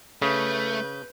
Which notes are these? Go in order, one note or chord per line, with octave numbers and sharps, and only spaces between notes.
C#3 A3 B4 G6